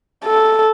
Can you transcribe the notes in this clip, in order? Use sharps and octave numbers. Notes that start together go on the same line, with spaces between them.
A4